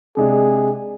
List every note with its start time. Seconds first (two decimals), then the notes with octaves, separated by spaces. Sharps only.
0.17 C3 G#3 D4 G#4